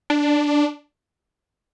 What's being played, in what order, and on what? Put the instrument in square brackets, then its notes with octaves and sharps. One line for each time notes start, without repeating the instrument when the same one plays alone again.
[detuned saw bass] D4